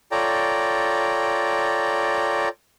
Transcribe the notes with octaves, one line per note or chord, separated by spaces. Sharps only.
F4 A4 C#5 D5 G5 A#5